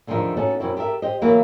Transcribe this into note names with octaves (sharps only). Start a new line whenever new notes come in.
E2 D3 D#3 F3 D#4 E5
B3 C#4 D#4 F#4 A4
F#2 B2 C4 E4
G4 A4 A#4 E5
G4 C5 D#5
E3 F#3 A#3 B3 E4 B4